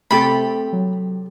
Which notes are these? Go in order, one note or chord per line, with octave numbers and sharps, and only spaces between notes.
C3 A3 C4 G4 A4 B5
F#3